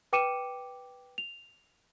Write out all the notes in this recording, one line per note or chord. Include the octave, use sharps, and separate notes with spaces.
B4 G5 D6 C#7 D#7 E7
F7